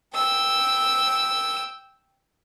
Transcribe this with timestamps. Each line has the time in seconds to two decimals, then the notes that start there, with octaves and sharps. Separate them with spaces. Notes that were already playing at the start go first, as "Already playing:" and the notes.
0.15 G5 E6